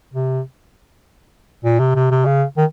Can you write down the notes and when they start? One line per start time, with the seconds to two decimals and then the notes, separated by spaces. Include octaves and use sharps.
0.13 C3
1.64 A#2
1.79 C3
1.95 C3
2.11 C3
2.25 C#3
2.57 D#3